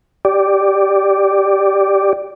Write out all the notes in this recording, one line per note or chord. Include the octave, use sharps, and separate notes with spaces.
G4 D5